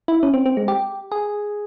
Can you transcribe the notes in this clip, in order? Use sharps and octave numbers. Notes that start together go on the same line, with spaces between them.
E4
C#4
C4
C4
G#3
G4
G#4